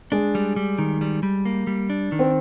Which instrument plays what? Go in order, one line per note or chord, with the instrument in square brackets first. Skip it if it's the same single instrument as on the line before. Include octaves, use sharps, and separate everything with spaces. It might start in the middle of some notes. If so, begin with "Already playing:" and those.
[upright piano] G#3 [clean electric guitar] D4
[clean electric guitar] G3
G3
D#3
G3
G3
A#3
G3
D4
D#3
[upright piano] C4